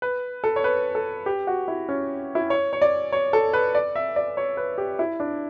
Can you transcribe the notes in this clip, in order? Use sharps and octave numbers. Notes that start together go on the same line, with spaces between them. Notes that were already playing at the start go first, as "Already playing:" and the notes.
B4
A4
C#5
B4
A4
G4
F#4
E4
C#4
E4
C#5
C#5
D5
C#5
A4
B4
D5
E5
D5
C#5
B4
G4
E4
D4